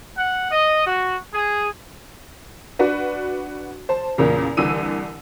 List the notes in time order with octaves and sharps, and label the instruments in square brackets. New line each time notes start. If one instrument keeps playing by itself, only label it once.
[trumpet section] F#5
D#5
F#4
G#4
[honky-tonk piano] D4 F#4 B4
C5 A5
E2 A#2 C#3
C2 D3 E3 E6 D#7